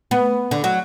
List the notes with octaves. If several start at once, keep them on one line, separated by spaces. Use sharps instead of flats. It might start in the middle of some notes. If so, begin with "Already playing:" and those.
B3
D3
F#3